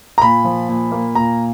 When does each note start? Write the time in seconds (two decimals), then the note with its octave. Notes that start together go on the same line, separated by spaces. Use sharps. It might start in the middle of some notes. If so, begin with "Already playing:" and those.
0.18 A#5
0.22 A#2 B5
0.45 F3
0.69 A#2
0.92 A#3
1.15 A#2 A#5